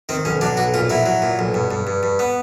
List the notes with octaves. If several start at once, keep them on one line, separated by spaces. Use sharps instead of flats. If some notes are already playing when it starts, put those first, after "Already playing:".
D#3 C4
B1 C#4
F#3 D4
B1 F#4
A#2 F4
F#3 E4
F#3
A#2
B1
G2
G2
G2
G2
B3